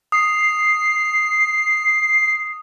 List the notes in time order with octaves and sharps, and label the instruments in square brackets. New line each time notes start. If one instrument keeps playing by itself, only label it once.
[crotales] D#6 [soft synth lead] C7